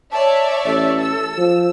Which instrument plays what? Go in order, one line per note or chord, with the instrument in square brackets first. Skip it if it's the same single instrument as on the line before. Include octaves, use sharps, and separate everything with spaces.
[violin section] C#5 D5 E5 [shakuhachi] A5
[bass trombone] A1 [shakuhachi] A4
[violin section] E6
[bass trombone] F3